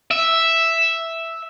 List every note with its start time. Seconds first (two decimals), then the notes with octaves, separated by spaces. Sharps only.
0.11 E5